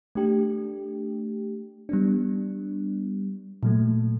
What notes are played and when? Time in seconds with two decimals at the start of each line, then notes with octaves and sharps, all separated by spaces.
0.15 A3 D4 G4
1.89 G3 B3 D4
3.63 A#2 F#3 A3